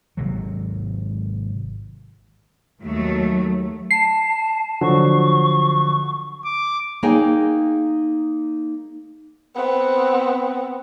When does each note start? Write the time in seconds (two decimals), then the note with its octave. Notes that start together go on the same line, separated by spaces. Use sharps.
0.17 G#1 C3 F#3
2.82 D#2 F#3 A3
3.91 A5 C7
4.81 D3 F3 F#3 C#6
6.45 D6
7.03 A#3 D#4 G#4 G5 G#5
9.55 B3 C4